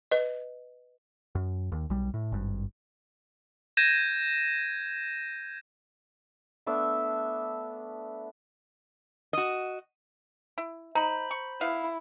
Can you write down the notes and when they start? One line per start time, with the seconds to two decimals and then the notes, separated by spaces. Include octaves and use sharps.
0.11 B4 D#5
1.35 F#2
1.72 D#2
1.90 B1 G3
2.14 A2
2.32 G#1 G2
3.77 G6 G#6 A#6 D#7 E7
6.66 A3 B3 D4 E5
9.33 F#4 D#5
10.58 E4
10.95 D#4 C5 A#5 B5
11.31 C#6
11.61 B3 E4 F5